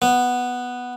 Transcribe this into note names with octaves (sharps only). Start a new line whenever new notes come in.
B3